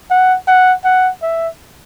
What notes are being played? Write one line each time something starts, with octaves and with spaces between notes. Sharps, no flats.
F#5
F#5
F#5
E5